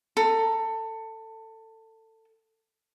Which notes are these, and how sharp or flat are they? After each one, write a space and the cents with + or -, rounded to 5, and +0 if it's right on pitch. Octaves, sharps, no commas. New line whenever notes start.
A4 +20 A#5 +20